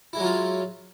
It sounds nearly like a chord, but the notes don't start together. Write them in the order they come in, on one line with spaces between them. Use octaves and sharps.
E4 G#3 F#3 F4